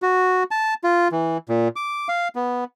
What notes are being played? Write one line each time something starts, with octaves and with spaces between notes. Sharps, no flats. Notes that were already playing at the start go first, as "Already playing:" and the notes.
F#4
A5
F4
E3
A#2
D6
F5
B3